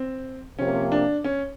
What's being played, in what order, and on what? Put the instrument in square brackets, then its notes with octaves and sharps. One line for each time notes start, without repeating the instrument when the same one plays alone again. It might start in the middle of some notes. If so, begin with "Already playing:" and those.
Already playing: [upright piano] C4
[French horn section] C3 F3 A#3 [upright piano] C#4
[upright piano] D4
C#4